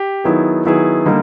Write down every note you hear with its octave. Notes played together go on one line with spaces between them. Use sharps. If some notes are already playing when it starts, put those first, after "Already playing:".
Already playing: G4
D#3 F#3 B3 E4 G#4
D#3 F#3 B3 E4 G#4
D3 G3 A#3 D#4